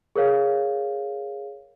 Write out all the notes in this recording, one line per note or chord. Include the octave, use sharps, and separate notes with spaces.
G#4 A#4 C#5 F5